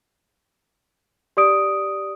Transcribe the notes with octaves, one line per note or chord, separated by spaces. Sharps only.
G4 D5 D#6 D7